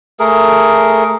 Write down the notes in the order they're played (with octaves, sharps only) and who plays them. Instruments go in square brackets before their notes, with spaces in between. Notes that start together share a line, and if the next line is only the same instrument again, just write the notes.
[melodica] A3 G#4 A#4